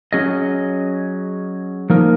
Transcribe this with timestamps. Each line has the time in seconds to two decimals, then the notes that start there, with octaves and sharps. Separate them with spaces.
0.13 F#3 C#4 G#4 D#5
1.90 F3 A#3 D#4 A#4